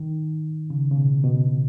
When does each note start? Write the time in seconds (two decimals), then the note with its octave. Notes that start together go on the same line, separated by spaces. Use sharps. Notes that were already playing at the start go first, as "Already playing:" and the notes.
Already playing: D#3
0.70 C#3
0.91 C#3
0.97 B2
1.24 B2